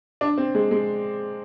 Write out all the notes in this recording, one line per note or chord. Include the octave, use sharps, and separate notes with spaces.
D4
C4
G#3
G#3